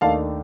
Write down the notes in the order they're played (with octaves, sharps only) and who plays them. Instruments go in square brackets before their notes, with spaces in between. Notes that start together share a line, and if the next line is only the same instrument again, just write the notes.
[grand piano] D#2 D#3 A3 D4 F5 A5